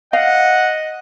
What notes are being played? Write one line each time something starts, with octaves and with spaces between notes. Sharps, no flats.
D#5 F5 F#5